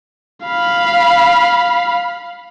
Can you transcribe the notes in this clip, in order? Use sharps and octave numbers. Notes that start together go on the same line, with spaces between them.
F5 B5